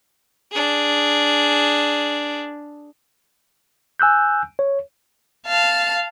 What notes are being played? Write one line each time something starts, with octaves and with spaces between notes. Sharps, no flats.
D4 G#4
G#5 E6 F#6 G6
C#5
F5 A5